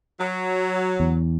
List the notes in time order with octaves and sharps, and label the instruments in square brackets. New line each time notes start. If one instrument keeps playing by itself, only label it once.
[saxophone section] F#3
[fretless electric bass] E2